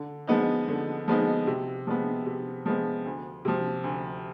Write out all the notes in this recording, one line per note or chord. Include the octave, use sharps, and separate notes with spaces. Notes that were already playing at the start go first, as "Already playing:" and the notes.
Already playing: D3
F3 G#3 B3 D#4
D3
F3 G#3 B3 D#4
C3
F3 G#3 B3
C3
F3 G#3 B3
D2
C3 F3
D2